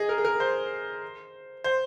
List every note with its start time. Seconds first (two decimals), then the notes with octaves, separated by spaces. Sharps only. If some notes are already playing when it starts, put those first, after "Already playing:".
Already playing: G#4 D#5
0.09 A#4
0.18 G#4
0.25 A#4
0.40 C5
1.64 C5